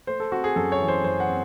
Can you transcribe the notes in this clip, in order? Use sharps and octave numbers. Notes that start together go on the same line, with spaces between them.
A3 C5
A4
C4 F#4
G#4
F#2 A4
C#5
E3
C5
F#2 C5
F#5
C4